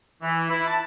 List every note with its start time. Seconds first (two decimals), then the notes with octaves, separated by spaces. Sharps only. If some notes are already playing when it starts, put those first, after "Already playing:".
0.22 E3
0.50 E4
0.67 A5